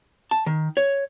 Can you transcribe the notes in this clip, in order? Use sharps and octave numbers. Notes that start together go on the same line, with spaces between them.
A5
D#3
C#5